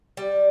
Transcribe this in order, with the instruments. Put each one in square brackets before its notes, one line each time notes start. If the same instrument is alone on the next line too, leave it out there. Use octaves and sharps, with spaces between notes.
[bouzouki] G3